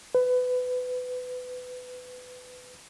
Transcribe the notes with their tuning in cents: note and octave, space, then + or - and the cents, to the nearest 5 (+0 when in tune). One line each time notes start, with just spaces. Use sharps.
B4 +25